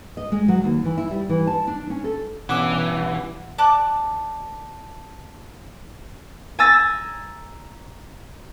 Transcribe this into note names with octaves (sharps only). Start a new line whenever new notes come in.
D#5
G#3
F#3
D#2
E3
E4
G3
E3
A5
D4
C#4
A4
G2 B2 E3 C#4 F#5 D6 E6
D5 A5 D6 F#6
G#5 A#5 E6 A6 A#6